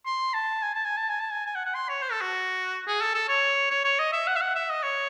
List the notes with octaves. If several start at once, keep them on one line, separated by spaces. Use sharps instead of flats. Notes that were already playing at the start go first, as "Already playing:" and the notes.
C6
A5
G#5
A5
G#5
A5
G#5
A5
G#5
G#5
F#5
F#5
C6
C#5
C5
A4
F#4
G#4
A4
A4
C#5
C#5
C#5
D#5
E5
F#5
E5
F#5
E5
D#5
C#5